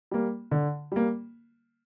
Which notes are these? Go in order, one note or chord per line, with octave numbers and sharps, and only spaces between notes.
G3 A#3
D3
G3 A#3